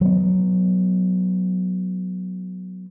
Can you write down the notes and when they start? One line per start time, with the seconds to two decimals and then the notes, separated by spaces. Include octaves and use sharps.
0.01 F#3 B3